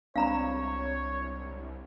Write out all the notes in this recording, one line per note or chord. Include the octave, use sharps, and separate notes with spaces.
C2 G#3 C4 D4 C#5 F5 A#5 B5